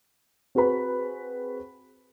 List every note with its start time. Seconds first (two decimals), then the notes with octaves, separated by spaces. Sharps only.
0.55 C4 F#4 G#4 B4 B5